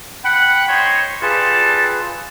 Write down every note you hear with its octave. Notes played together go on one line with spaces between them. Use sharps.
F#5 G5 B5
D#4 C5 C#5
G3 F4 G#4 A4 B4 A5